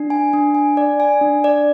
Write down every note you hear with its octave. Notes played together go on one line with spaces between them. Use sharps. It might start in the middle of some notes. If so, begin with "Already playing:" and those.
Already playing: D4
G#5
D4
G#5
D5
G#5
D4
D5